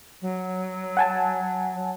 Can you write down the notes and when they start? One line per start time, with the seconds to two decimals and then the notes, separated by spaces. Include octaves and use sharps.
0.22 F#3
0.97 F#5 G#5 A5